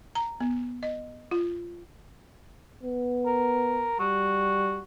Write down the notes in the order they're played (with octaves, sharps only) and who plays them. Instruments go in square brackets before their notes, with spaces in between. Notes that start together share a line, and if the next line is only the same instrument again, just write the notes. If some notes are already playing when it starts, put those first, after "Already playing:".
[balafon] A#5
B3
D#5
F4
[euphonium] B3
[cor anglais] A#4
[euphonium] G3 [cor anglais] F#4